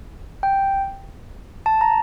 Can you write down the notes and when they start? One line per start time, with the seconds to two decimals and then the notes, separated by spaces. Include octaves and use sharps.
0.43 G5
1.66 A5
1.81 A#5